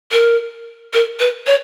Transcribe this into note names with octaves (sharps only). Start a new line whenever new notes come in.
A#4
A#4
B4
C#5